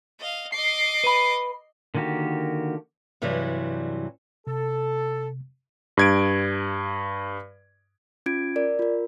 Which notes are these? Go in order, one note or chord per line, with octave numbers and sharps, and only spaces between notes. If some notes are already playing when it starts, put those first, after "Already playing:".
D#5 F5
D#5 D6 C7
B4 B5
D3 D#3 A#3 F#4 G4
G2 C3 E3 F#3 G3
C3 A4
G2 G#6 D7
C#4 F4 G#6 D7
A#4 D5
F4 A#4